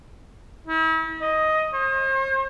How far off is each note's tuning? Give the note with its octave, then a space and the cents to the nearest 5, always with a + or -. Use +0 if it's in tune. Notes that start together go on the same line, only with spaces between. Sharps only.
E4 -40
D#5 +10
C5 +45